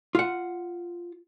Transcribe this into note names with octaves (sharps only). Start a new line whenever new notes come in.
F4 F#5